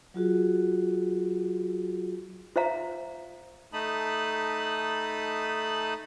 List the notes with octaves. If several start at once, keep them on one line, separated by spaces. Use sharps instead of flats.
F#3 F4 F#4 G#4
F4 C5 E5 F5 A#5
A3 D#4 A5 B5 D#6